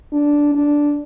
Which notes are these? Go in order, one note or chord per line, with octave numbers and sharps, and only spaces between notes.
D4
D4